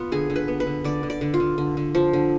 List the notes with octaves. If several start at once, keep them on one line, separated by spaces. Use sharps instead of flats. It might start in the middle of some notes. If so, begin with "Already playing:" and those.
Already playing: B3 F4
D3 G#4
D3
B4
B3
B4
D3
D3 D5
D3
D5
D3
F4
D3
D3
D3
F3
D3